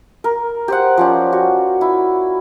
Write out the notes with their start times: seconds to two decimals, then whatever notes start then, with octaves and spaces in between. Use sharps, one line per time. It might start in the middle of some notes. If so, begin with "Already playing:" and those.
0.24 A#4
0.68 G4 C5 F#5
0.97 F3 C#4 D5
1.33 F#4
1.81 E4